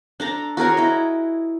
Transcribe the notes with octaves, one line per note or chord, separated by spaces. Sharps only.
D4 A4 A#5
F#4 G#4 A#4 C#5
E4 D#5